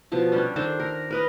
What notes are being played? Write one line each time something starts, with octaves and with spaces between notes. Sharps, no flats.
B2 F3 A5
G3 C#4 D4
D#3 D4 A4 C5
A#4
A#4 B4 D#5